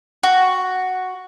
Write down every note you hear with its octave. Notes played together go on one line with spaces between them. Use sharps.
F#4